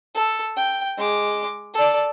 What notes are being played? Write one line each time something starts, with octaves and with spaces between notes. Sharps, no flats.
A4
G5
G#3 D6
A4 D5